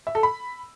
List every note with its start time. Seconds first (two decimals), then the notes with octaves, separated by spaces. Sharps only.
0.07 E5
0.15 A4
0.23 B5